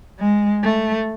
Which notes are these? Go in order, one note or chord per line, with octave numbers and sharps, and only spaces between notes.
G#3
A3